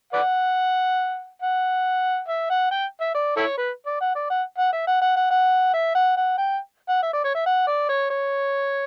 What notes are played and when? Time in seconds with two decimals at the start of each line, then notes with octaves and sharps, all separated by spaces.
0.13 B4 D5 F#5
1.42 F#5
2.29 E5
2.50 F#5
2.71 G5
3.01 E5
3.15 D5
3.37 E4 A4 C#5
3.58 B4
3.86 D5
4.01 F#5
4.15 D5
4.30 F#5
4.59 F#5
4.73 E5
4.87 F#5
5.02 F#5
5.16 F#5
5.31 F#5
5.74 E5
5.95 F#5
6.17 F#5
6.38 G5
6.89 F#5
7.03 E5
7.13 D5
7.25 C#5
7.35 E5
7.46 F#5
7.67 D5
7.89 C#5
8.11 C#5